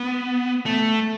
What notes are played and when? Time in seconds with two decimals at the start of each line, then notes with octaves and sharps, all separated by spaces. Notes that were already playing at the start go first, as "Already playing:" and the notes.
Already playing: B3
0.66 A3